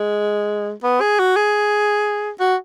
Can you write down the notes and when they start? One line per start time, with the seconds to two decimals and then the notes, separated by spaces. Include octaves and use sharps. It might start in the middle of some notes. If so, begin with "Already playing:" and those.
Already playing: G#3
0.84 B3
1.01 G#4
1.19 F#4
1.36 G#4
2.40 F#4